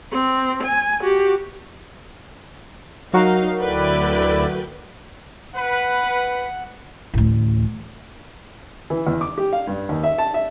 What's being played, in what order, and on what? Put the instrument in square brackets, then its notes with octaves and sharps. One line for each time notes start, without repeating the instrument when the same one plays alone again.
[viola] C4
G#5
F#4 G4
[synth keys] F#3 F#4 A#4 [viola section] D#4 F5
[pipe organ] D2 E4 D5 [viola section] A4 B4 G5
[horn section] B4 [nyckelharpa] F#5
[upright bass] A1 D2
[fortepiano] E3
E2
D6
G4
F5
G2
D#2
E5
A5
E5